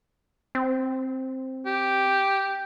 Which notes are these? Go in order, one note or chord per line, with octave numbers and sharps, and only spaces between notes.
C4
G4